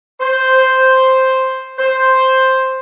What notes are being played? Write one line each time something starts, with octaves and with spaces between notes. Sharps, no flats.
C5
C5